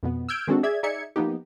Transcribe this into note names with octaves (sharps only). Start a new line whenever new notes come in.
F2 B2 B3
E6 F6 G6 G#6 D7
D#3 G#3 C4 D4 F#4 A4
G#4 D5 E5 G#6
D#4 G#4 D5 E5 G#6 C#7
F3 A#3 B3 D#4 G4